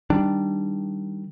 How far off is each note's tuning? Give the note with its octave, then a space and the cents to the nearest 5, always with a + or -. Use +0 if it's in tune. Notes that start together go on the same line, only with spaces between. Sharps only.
D#3 +10 G3 -5 D4 +0